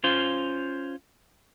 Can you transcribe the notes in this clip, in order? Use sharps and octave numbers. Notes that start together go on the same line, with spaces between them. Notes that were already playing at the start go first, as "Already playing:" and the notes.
C#4 F4 C5